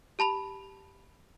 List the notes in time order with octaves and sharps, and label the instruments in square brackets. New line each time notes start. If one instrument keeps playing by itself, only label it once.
[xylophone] G4 A5 B5 F7